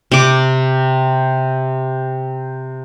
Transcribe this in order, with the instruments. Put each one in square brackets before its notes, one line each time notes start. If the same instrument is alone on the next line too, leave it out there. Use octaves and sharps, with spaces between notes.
[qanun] C3 D6